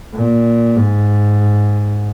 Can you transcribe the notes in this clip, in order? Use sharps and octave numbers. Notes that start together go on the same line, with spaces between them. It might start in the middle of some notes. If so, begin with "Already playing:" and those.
A#2
G#2